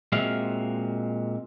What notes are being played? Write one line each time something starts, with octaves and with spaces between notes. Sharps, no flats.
A#2 G#3 C4 F#4 E5 F5